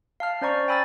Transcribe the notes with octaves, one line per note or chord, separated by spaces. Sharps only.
F5 A5 F6
C#4 C5 D5 A#5 C#6
G5 G#5 B5 E6 F6 A6